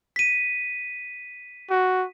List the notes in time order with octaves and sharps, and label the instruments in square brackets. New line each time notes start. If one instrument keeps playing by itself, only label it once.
[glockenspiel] B6 D#7
[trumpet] F#4